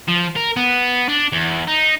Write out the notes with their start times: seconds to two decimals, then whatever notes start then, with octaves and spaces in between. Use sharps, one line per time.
0.08 F3
0.36 A#4
0.57 B3
1.09 D4
1.32 E2
1.67 D#4